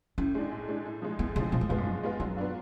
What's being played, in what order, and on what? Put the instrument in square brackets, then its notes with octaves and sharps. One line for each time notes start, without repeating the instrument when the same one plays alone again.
[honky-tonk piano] A2 [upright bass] C#4
[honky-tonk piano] G#3 D4
A2
G#3 D4
A2
F3 G#3
[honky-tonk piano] A2 [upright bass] B3
[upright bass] C#3 [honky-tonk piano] F3 G#3
[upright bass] B2 [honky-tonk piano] F3
[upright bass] A2
[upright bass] G#2 [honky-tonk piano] G#3 B3 F4
[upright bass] F#2
[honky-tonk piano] F3
G#3 B3 F4
[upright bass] F#2 [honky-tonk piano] F#3
[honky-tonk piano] B3 D4 F4